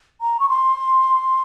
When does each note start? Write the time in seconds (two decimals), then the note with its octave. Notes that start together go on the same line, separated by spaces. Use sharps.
0.21 A#5
0.40 C#6
0.49 C6